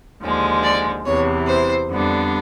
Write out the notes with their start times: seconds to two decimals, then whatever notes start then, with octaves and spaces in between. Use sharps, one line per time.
0.22 D#2 D3 F3 G#3
0.63 D5
1.05 E2 C3 E3 C#5
1.47 C5
1.89 F2 D3 G3 B3 D4